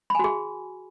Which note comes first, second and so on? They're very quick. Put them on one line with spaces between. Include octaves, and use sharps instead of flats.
B5 G#5 F#4 G#4